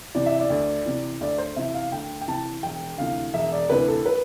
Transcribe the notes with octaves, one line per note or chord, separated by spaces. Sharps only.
C3 E3 D5
E5
D5
D2
C3 E3
D2 D5
C5
C3 E3 E5
F5
D2 G5
G5
C3 E3 A5
E1 G5
D2 C3 E3 F5
E1 E5
D5
D2 C3 E3 B4
A4
B4